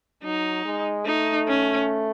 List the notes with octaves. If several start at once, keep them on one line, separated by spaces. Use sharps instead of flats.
F#3 D#4
G#3
A3 D#4
C#4